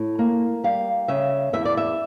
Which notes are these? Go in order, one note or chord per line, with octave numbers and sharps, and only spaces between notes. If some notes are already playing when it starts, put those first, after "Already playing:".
Already playing: A2
A#3
G3 F5
C#3 E5
E2 E5
D5
E5